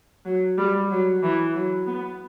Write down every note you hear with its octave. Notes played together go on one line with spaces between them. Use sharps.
F#3
G3
F#3
E3
F#3
B3